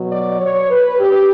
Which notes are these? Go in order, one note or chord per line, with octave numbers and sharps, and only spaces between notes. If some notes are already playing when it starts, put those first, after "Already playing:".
Already playing: B2 F#3
D5
C#5
B4
G4